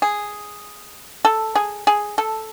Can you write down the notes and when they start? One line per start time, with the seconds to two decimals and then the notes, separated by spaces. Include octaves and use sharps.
0.02 G#4
1.25 A4
1.55 G#4
1.87 G#4
2.18 A4